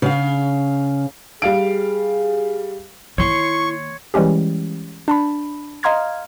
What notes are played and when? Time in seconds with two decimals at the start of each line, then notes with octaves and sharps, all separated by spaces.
0.02 C#3 F5
1.42 G3 G#4 F5 D7
3.18 D#3 A#3 E4 C#5 C6 C#6
4.14 E3 G3 G#3 C#4 G4
5.08 D4 A5 B5
5.83 D#5 F5 A#5 C6 F6 G#6